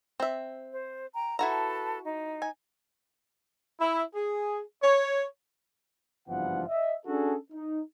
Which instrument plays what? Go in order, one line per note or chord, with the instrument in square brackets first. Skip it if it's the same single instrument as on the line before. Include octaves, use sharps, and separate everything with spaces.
[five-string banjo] C4 E5
[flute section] C5
G5 A#5
[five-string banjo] E4 F#4 A#5 [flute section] A4 B4 A5
[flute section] D#4
[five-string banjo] G#5
[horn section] E4
G#4
C#5
[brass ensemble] F#1 G2 E3 F3 B3 F#5
D#5 E5
C#4 D4 F#4 G#4 A4
D#4